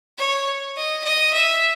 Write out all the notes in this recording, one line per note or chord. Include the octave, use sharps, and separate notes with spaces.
C#5
D#5
D#5
E5